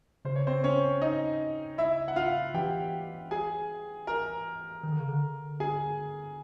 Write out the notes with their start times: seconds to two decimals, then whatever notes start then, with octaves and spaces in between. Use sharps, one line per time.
0.25 C#3 C5
0.36 C#5
0.47 C4 C5
0.64 C#4 C#5
1.01 D#4 D#5
1.78 E4 E5
2.08 F#5
2.16 F4 F5
2.54 E3 G4 G5
3.31 G#4 G#5
4.07 A#4 A#5
4.83 D#3
4.92 D3
5.00 C#3
5.09 D3
5.60 G#4 G#5